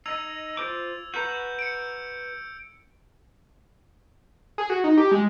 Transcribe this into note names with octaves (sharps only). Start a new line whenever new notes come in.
D#4 D#5 E6 G#6 F7
F4 C5 D6
F#4 B4 A#5 G6
C#7 D7
G#4
F#4
D#4
G4
G#3